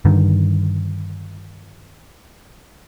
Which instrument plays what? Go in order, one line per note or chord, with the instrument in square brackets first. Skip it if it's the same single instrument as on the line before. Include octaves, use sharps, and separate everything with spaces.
[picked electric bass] G2 D3 D#3